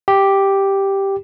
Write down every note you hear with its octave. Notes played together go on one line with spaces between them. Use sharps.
G4